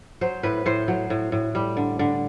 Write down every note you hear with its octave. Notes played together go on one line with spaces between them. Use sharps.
F#3 C5
A2 B4
A2 C5
F#3
A2
A2
G3
D3
D3